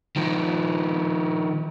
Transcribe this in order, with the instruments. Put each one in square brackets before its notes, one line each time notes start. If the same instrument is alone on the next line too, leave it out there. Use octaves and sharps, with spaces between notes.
[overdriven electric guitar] D#3 F3